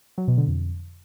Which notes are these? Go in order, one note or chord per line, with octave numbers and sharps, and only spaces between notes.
F#3
B2
D3
F2